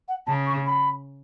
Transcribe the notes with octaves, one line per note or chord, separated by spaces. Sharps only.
F#5
C#3 A5
C#6
B5